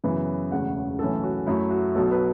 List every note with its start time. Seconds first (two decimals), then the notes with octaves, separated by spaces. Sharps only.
0.04 F#2 C#3 E3 B3
0.52 E1 E2 C#3 A3 F#5
0.99 B1 A2 E3 C#4 A4
1.24 F#4
1.46 F#2 F#3 A3 E4
1.70 F#4
1.95 B1 B2 F#3 A4
2.11 B4